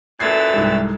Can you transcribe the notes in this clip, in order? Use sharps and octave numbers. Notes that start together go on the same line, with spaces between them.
F#2 A#2 E3 A4 E6 G#6 A6 C7
C2 G#2